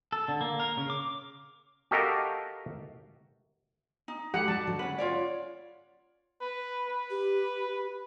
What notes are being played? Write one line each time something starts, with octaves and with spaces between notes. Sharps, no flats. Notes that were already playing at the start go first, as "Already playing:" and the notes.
A4
D3
A#3
A#4
C#3
D6
F#4 G4 A4 A#4 D#5 F5
D#4
G#3 F#4 G4 A4 F#5
G3 F#4 A5
G#2 D3 F#3
C#4 B4 F#5
F4 C#5 D5
B4
B4
G4